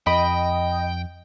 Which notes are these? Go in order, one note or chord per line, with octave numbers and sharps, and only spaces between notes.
F2 D#5 G5 B5